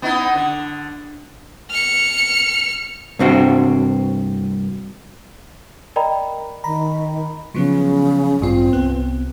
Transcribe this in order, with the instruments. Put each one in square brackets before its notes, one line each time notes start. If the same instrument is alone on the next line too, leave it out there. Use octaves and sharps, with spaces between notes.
[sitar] B3 D#4 E4
D3
[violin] F6 C#7
[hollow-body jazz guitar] C2 G2 C4 F#4
[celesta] A#4 D5 D#5 G5 A#5 B5
[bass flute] D#3 [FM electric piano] A#5 B5
[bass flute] C#3 [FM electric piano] F3 F#3 B3
[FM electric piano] A1 G2 F4 [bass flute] C4
[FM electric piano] C2 B3